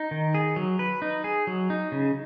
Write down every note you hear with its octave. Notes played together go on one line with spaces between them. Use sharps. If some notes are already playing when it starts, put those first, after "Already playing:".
Already playing: D#4
D#3
G#4
F#3
B4
D#4
G#4
F#3
D#4
C#3